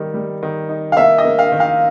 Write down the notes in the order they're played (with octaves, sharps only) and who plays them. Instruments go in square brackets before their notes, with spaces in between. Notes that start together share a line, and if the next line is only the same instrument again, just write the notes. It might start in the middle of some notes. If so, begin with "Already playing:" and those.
Already playing: [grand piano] D#3 G3 A#3
G3
D#3
D#4
[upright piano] F5
[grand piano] A#3 [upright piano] E5
[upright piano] D#5
[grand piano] A#3
[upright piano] F5
[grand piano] D#3
[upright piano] F5